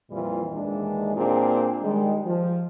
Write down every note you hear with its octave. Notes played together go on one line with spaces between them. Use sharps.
F2 A#2 E3 G3 F4
D#2 E3 G#3 D4
A#2 C4 D4 G4 G#4
D#3 G3 G#3
F3